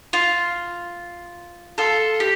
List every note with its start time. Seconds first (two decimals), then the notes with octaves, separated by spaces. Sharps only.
0.13 F4
1.78 F4 A4
2.20 G4